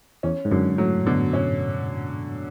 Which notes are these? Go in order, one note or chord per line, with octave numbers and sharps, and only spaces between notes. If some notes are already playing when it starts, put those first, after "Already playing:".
E2 C#4
G#2
F#2 D3
A2 F#3
B2 D3
C#4